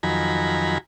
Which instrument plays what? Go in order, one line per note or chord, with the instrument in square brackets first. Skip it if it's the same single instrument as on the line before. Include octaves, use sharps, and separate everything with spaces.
[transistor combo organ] F2 D#3 F#3 G#5 A#5 B5